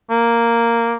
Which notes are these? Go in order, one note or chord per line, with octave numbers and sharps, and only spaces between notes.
A#3